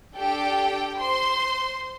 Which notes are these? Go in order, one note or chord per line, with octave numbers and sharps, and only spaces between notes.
D4 G4 A4 G5
C5 C6